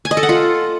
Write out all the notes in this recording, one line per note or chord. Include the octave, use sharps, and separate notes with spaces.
G#5
D#5
A4
F#5
F4